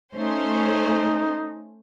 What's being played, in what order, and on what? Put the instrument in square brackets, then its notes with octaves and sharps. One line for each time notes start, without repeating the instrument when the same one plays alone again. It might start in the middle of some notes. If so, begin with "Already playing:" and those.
[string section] A3 C#4 C5 [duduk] D#4